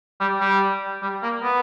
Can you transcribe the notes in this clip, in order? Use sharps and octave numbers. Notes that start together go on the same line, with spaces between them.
G3
G3
G3
A#3
B3